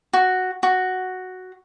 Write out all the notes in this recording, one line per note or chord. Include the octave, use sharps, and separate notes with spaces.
F#4
F#4